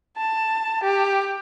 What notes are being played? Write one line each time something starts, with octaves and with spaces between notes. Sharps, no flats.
A5
G4